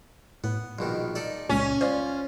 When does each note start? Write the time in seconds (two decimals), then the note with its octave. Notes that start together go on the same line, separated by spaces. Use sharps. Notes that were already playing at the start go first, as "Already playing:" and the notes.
0.44 A2 B3
0.79 A#1 B2 D#3
1.15 D#4 A4 D5
1.49 C#2 A#2 C#4
1.81 F4 C5 D5